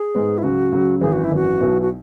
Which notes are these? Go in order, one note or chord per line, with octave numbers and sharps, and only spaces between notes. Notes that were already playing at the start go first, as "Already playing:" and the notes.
Already playing: G#4
G#2 G#3 B3
E4
C#2 C#3 F#3 F#4
C#2 C#3 F#3
G#1 F#2 E3 G#4
F#4
E4
G#1 F#2 E3 F#4
B1 B2 B3 E4
F#4